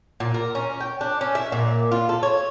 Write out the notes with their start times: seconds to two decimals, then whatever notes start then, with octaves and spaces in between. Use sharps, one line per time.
0.20 A#2
0.34 A#4
0.55 C#4
0.80 G5
1.01 D4
1.21 C#4
1.35 E5
1.52 A#2
1.92 F4
2.09 A4
2.23 C#5